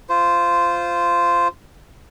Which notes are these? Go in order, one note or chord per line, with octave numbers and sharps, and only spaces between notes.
F4 C5